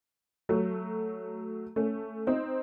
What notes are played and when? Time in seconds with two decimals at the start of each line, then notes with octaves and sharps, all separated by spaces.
0.49 F#3 A3
1.76 A3 C#4
2.27 C4 D#4